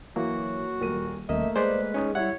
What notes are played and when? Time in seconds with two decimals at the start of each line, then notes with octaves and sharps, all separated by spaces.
0.16 E3 F#3 A#3 F#4
0.80 D#1 A#4 D#7
1.29 D#1 A3 A#3 D#5 E5
1.56 G#3 B4 C5 D5
1.94 C#4 D#4
2.15 G3 E4 C#5 E5 F#5